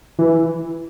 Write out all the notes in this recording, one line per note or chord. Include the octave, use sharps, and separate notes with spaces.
E3